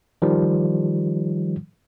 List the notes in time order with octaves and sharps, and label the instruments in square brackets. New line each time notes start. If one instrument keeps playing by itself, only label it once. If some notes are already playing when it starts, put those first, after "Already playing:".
[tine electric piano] D#3 F3 G3